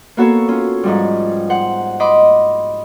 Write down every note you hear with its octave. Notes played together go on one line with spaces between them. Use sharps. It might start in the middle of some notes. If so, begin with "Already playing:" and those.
A#3 B3 F#4 A4 C#5
C#4 F4
G#2 F3 G3
C5 F#5
D#5 B5 C6 D6